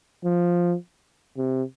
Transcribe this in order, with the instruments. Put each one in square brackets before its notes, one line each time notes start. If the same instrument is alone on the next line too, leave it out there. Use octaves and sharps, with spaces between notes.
[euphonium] F3
C3